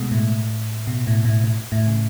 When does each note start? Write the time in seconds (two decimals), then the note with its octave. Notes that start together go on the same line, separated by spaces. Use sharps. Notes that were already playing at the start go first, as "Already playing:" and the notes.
Already playing: B2 G#3 A3 B3
0.11 A2
0.87 B2
1.07 A2
1.25 A2
1.44 A2
1.72 A2
1.87 C#3